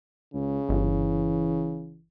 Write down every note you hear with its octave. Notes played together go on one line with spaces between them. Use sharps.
C#2 C#3
G1 E3